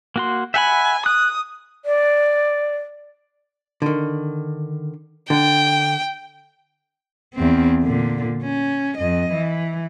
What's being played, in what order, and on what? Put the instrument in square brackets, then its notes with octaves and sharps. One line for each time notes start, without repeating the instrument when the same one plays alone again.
[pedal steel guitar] A#3 F#4 C6
[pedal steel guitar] E5 F#5 B5 [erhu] G#5
[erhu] D#6 [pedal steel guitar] F#6
[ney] D5
[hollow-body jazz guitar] D3 D#3
[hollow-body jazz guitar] D3 [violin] G5
[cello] E2 C4
A#2 D3
C#4
F2 D#5
E3